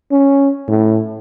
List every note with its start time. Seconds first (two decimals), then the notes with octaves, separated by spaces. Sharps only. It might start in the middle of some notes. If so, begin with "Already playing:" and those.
0.11 C#4
0.68 A2